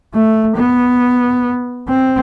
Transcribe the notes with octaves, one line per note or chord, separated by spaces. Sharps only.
A3
B3
C4